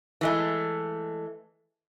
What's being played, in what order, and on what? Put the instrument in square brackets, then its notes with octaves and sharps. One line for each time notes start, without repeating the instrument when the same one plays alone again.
[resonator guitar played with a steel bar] E3 G#3 A3